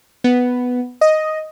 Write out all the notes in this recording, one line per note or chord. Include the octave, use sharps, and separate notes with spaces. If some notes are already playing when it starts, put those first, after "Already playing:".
B3
D#5